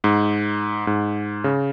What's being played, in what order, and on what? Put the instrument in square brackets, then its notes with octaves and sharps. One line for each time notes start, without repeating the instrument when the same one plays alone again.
[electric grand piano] G#2
G#2
C#3